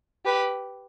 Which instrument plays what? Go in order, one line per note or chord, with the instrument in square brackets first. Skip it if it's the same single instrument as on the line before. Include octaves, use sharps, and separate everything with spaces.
[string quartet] G4 B4